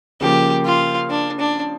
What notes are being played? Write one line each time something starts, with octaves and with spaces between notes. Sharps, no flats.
C#3 F3 A#3 G4
F4
D4
D4